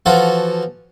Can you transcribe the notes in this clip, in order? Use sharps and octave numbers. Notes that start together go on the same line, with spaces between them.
E3 F3 F#4 A4